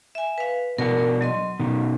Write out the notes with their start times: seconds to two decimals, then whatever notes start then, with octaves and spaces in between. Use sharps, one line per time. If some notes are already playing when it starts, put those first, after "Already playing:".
0.15 E5 G#5
0.38 B4 F5
0.78 B2 D4 A#4 F#5
1.21 F#3 D#5 C6
1.60 B2 D#3